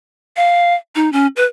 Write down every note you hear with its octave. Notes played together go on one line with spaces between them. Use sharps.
F5
D#4
C#4
B4